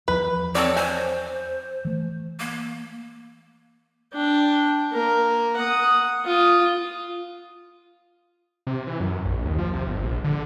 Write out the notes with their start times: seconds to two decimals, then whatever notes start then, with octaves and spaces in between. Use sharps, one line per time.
0.08 E2 F3 B4
0.55 C4 A4 C#5 D5
0.76 C5 G#5
1.85 E3 A3
2.40 A#3
4.13 D4 G5
4.93 A#3 A#4
5.57 F#5 D#6
6.25 F4 D#6
8.67 C3
8.87 E3
9.00 F#2
9.25 A#1
9.45 D#2
9.58 F3
9.74 C3
9.87 G1
10.03 A#1
10.24 D3